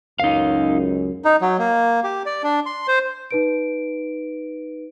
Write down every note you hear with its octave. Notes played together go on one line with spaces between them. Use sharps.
C#2 F#2 D#4 F5
D#4
F#3
A#3
G4
D5
D4
C6
C5
D#4 B4 D7